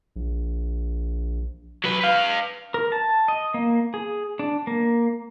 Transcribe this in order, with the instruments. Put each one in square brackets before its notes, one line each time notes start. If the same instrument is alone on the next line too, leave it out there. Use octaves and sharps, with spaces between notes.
[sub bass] A#1
[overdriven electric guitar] F#3 B4
B4 F5
[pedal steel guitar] A#4
A5
D#5
A#3
G#4
D4
A#3